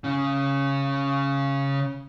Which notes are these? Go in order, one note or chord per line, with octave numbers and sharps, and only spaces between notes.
C#3 C#4